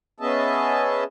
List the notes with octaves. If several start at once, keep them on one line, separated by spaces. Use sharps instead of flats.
B3 C#4 G#4 D#5 E5 A5